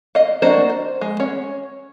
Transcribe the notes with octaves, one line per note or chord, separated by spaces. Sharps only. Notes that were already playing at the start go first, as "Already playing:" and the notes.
D#5 F5
A#3 D4 F#4 C5 D#5
C5
G#3
C#4 C#5